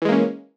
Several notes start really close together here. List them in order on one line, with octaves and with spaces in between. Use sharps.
E3 G#3 A#3 C#4